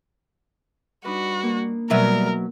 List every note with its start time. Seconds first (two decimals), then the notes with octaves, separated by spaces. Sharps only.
1.05 G3 D4 D#4 F#4 B4
1.43 A#3
1.90 B2 F#3 G3 A#4 E5